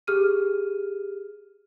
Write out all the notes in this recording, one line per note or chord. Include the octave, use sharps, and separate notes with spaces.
G4 G#4 F6 D#7